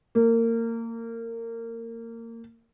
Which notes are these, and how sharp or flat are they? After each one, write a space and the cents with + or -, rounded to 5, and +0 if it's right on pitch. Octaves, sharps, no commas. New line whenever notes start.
A#3 -25